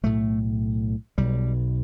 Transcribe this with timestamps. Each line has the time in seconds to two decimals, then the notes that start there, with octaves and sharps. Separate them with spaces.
0.03 B1 A2 A3
1.18 B1 B2 G3